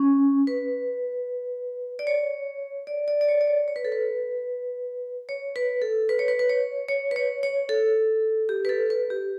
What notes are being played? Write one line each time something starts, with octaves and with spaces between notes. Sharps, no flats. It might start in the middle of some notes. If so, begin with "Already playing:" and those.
Already playing: C#4
B4
D5
C#5
D5
D5
D5
C#5
D5
C#5
C#5
B4
A4
B4
C#5
B4
A4
B4
C#5
B4
B4
C#5
C#5
B4
C#5
C#5
A4
G4
B4
A4
B4
G4